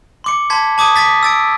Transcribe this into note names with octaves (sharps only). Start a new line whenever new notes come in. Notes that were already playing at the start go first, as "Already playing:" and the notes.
C6 D6 C#7
A5 C6 G#6 B6
A5 D6 D#6 G#6 D#7
D6 G#6 A6 B6
E6 A6 D7